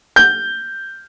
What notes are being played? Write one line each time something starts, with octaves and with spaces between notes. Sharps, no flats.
G6